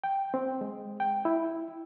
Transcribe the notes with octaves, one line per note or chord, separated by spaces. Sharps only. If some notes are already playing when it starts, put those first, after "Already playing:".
G5
C4
G#3
G5
E4